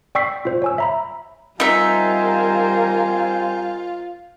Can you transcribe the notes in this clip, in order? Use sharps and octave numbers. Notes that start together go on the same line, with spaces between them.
D5 G5 C#6 E6 B6 C7
F4 C5
C#5 G#5 E6
E5 A#5 B5
G3 C4 D#4 F4 A#4 C5 E5 G#5